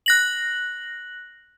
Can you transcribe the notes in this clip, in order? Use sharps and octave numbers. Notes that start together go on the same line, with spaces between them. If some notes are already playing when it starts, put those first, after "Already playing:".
F#6 A#6 F#7